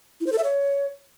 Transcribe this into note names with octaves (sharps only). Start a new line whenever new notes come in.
E4
C5
A4
E5
C#5